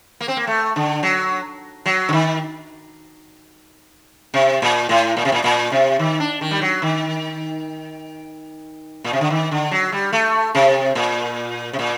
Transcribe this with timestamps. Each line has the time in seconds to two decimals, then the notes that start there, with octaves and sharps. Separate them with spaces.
0.21 A#3
0.28 C4
0.37 A#3
0.47 A3
0.76 D3
1.03 F#3
1.86 F#3
2.09 D3
2.13 D#3
4.34 C3
4.62 A#2
4.89 A2
5.17 A#2
5.25 C3
5.32 A#2
5.44 A#2
5.72 C3
5.99 D#3
6.20 D4
6.41 D#3
6.51 G3
6.61 F#3
6.82 D#3
9.04 A#2
9.13 C3
9.21 D3
9.30 D#3
9.51 D3
9.71 F#3
9.92 G3
10.12 A3
10.55 C3
10.95 A#2
11.73 C3
11.79 A#2